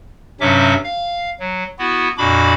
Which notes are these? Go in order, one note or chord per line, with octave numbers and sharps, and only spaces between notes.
G2 C3 F#3 C#4 E5 D6
F5
F#3
B3 E4 F#4
F2 A#2 D4 F#4 B5 D6